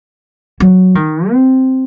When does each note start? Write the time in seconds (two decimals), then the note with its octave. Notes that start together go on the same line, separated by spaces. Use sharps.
0.60 F#3
0.95 D#3
1.31 C4